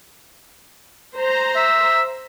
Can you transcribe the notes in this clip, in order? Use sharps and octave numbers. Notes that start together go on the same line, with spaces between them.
C5 A#5
E5